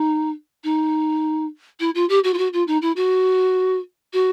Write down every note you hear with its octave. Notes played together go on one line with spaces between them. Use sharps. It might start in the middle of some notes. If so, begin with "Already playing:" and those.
Already playing: D#4
D#4
E4
F4
G4
F#4
F4
F#4
F4
D#4
E4
F#4
F#4